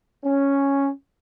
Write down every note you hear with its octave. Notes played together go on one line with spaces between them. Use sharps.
C#4